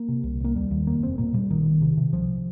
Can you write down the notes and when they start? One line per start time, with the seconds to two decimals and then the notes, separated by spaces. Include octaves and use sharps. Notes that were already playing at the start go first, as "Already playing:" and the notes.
Already playing: A#3
0.09 C3
0.24 C2
0.40 C2 A#3
0.55 D#2 G3
0.71 D#2
0.87 F1 A#3
1.03 F1 C4
1.18 A#2 A#3
1.34 A#2 G3
1.50 A#1 D#3
1.66 A#1
1.82 C3
1.97 C3
2.12 C2 F3